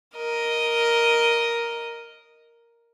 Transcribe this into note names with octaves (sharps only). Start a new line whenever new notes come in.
A#4 D#5